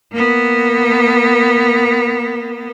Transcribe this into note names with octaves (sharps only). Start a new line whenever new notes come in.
A#3 B3